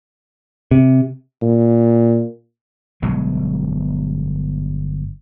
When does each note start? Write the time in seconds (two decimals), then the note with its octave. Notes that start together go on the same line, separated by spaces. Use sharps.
0.71 C3
1.42 A#2
3.02 G1 B2 F#3 G#3